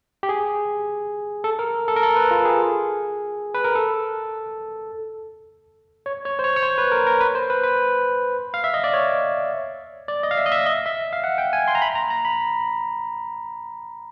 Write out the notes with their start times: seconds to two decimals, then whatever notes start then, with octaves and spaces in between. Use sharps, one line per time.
0.23 G4
0.29 G#4
1.44 A4
1.59 A#4
1.88 A4
1.96 A#4
2.03 A4
2.16 B4
2.31 F4
2.45 G#4
3.54 B4
3.64 A#4
3.75 A4
6.06 C#5
6.25 C#5
6.39 C5
6.44 C#5
6.56 C#5
6.63 C5
6.78 B4
6.92 A#4
7.07 A#4
7.21 B4
7.35 C5
7.50 B4
7.63 B4
8.54 F5
8.64 E5
8.74 D#5
8.84 D5
8.93 C#5
10.08 D5
10.23 D#5
10.31 F5
10.37 E5
10.46 D#5
10.52 E5
10.66 D#5
10.86 E5
11.13 F5
11.24 F#5
11.38 G5
11.53 G#5
11.68 C6
11.75 A#5
11.82 B5
11.95 A#5
12.10 A#5
12.25 B5